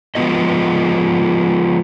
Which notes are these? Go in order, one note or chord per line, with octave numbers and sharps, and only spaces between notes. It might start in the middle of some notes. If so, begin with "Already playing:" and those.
F3 G#3 B3 D#4 F#4 D#5